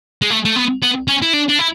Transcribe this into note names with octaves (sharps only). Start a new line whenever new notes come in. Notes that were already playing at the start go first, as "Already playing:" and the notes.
G#3
A3
A3
B3
B3
C#4
E4
D4
D4
E4